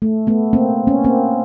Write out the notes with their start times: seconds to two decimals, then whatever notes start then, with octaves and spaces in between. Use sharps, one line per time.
0.02 A3
0.27 A3 B3
0.53 A#3 C4
0.87 B3 C#4
1.04 A#3 C4